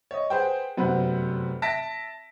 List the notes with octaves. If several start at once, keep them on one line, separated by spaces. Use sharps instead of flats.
C#5 D#5
G#4 B4 C5 F#5 G5
F1 F#2 B3 B4 C5 F#5
E5 A5 A#6 B6 D7